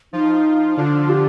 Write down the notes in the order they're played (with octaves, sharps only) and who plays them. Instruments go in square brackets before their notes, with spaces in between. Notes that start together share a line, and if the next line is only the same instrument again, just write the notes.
[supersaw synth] F3 F4 [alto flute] D#4
[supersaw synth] D3 D4 [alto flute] F4
[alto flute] G4